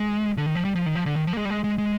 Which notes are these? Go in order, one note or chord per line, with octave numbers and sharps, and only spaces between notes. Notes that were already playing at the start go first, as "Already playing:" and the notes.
Already playing: G#3
D3
D#3
F3
G3
F3
D#3
F3
D3
D#3
F3
A#3
G#3
G3
G#3
G#3
G#3